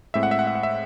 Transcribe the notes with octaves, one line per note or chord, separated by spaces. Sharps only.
A2 G#3 C4 E5
F#5
E5
F#5
E5
F#5
E5